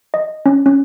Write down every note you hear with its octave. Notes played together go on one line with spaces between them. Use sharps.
D#5
C#4
C#4